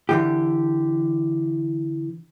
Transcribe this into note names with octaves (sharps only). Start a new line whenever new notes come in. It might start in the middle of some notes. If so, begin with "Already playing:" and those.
D3 E3 G4